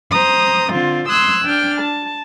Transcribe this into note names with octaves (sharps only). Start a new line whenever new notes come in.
C5 A#5 D#6
D3 C4 F4
C6 D#6 E6 F#6 G#6
D4 G5 F6
A5